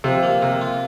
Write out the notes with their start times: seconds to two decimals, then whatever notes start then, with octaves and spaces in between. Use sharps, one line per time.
0.04 C3 F3
0.23 A#3
0.42 C3 A#4
0.61 F4